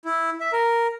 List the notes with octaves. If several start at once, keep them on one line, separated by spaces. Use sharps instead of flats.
E4
E5
A#4